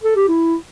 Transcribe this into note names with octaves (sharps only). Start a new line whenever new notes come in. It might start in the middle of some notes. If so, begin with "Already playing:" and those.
A4
G4
E4